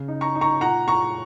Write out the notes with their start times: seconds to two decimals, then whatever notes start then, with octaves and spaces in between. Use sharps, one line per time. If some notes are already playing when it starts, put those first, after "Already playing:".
Already playing: C#3
0.08 D#4
0.21 A#5 C#6
0.35 D#4
0.41 A#5 C#6
0.61 A#2 F#5 A#5
0.87 A#2 A#5 C#6